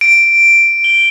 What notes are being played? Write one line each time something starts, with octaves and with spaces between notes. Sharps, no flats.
D7
G7